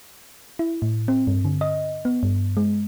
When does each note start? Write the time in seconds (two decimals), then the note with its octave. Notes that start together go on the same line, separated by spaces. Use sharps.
0.59 E4
0.82 A2
1.08 C4
1.27 G2
1.45 D3
1.61 D#5
2.05 B3
2.23 G2
2.57 G#3